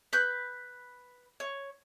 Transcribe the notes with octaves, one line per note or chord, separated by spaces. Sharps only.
B4 F#6 G6
C#5